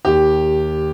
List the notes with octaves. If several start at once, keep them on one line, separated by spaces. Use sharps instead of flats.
D#2 D#3 G4